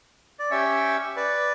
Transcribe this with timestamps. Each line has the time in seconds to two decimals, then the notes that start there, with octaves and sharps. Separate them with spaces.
0.39 D5
0.51 C#4 G4 C#5 E5
1.17 B4 D5